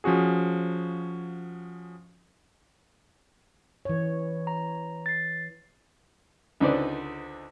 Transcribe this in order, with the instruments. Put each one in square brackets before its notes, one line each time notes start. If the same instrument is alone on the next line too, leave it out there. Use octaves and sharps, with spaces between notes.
[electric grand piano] F3 C#4 F#4 G#4
[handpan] E3 C#5
[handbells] A#5
A6 C7
[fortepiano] C#2 D3 D#4 B4 C5 D5